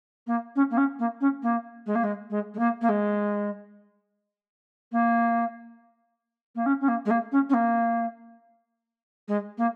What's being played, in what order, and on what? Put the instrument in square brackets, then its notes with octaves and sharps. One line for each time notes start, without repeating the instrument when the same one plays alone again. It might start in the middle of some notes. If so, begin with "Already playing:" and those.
[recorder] A#3
C#4
A#3
C#4
A#3
C#4
A#3
G#3
A#3
G#3
G#3
G#3
A#3
A#3
G#3
A#3
A#3
C#4
C#4
A#3
G#3
A#3
C#4
C#4
A#3
G#3
A#3